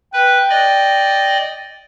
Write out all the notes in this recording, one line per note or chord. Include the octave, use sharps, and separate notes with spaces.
B4 G5
D5 D#5